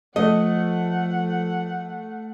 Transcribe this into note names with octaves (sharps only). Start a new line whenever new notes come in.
F3 A3 D#5 F#5